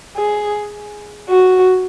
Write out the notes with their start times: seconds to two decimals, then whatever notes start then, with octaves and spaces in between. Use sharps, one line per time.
0.17 G#4
1.29 F#4